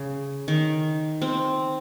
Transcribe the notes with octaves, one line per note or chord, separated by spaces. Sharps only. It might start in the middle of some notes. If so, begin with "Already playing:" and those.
Already playing: C#3
D#3
C4